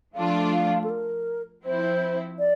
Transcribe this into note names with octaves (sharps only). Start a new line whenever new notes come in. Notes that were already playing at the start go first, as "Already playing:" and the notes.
F3 A3 D4 F4 F5
F5
A4
A#4
F3 C4 E4 C5
D5